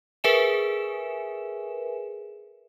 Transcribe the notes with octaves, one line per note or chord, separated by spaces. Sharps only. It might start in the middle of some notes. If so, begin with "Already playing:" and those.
G#4 A#4 B4 E5 G#5 E7